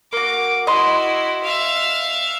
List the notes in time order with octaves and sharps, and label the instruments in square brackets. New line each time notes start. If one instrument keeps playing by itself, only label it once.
[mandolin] A#3 F#4 [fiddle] D6
[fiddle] E4 F#4 [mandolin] D#5 C6
[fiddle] E5 F5